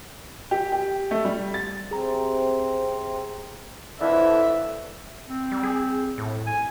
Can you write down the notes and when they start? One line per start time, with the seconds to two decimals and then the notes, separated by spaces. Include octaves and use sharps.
0.51 G4
0.72 G4
1.11 A3
1.25 G3
1.54 A6
1.91 C3 C4 G#4 A#5
4.00 F2 D3 E3 E5
5.28 C4
5.52 G3
5.63 G#4
6.18 A2
6.47 G#5